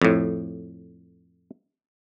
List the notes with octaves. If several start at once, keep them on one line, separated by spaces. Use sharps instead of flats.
F2 A2